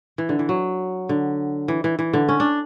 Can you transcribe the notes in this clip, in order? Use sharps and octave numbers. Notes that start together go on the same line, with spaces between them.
E3
D3
E3
F#3
D3
E3
E3
E3
D3
C#4
D4